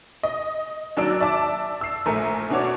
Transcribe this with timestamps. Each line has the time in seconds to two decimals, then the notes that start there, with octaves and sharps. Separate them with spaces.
0.23 D#5
0.97 D#2 F#3 D4 D5 E6 D7
1.20 D5 E5 A5 D6
1.81 E6 C7
2.06 A#1 A3 A#4 G#5
2.50 B2 D4 F#4 C#5 D6